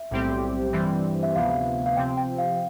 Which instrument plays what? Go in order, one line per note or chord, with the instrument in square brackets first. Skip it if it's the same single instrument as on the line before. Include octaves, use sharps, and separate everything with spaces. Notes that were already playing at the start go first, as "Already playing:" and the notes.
Already playing: [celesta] E5
[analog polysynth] B1 A2 G3 C4 G4
G2 E3 G3 C4
[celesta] E5
[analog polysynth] D2 C3 F3 B3 [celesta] F5
[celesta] F5
[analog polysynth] C3 F3 C4 [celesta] G5
[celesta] G5
F5